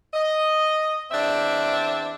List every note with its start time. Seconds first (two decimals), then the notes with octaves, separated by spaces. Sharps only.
0.14 D#5
1.11 E2 C4 D4 E5